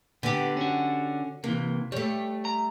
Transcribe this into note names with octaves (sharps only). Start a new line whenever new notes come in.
D3 B3 G4
C#4 F#4
C3 E3 A#3
G3 A3 C#5
A#5